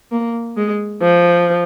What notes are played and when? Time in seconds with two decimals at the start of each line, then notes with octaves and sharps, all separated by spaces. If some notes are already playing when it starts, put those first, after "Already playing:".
0.12 A#3
0.57 G#3
1.01 F3